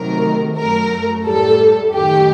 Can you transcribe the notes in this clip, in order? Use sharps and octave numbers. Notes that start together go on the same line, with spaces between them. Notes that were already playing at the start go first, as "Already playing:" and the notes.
Already playing: C3 D#3 F#3 A3 A#4
F#2 F#3 A3 A#4
A2 G3 A4
F#2 D#3 A3 G4